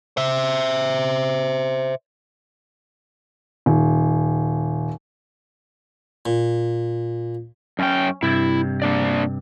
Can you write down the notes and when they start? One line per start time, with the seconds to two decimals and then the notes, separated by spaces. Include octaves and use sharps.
0.17 C5 E5
3.66 D#1
6.26 A#2
7.79 F#2 C#4 G5
8.23 G2 C3 E4
8.82 A#3 D4 D5